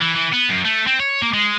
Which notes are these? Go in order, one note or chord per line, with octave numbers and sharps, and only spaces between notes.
E3
E3
B3
F#2
A3
C4
C#5
A#3
G#3